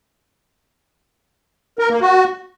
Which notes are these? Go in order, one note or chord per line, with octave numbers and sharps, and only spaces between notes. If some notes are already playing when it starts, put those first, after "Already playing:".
A#4
A#3
F#4